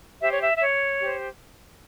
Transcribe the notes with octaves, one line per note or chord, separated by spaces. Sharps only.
G4 C5 E5
C#5
E5
E5
C#5
G4 C5